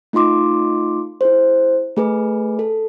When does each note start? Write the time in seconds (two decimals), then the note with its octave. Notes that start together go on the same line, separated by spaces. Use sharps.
0.13 A3 D#4 F4 C6 D6
1.21 E4 G#4 C5
1.97 A3 G#4 B4
2.59 A4